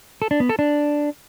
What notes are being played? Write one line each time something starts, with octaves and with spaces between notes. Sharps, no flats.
A4
D4
B3
A4
D4